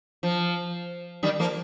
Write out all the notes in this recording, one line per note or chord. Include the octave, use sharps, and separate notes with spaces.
F3
D#3 G3
F3 A#3